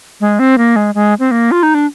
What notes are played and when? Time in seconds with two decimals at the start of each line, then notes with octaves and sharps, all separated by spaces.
0.21 G#3
0.39 C4
0.58 A#3
0.76 G#3
0.95 G#3
1.20 C4
1.31 A#3
1.51 F4
1.63 D#4
1.75 D4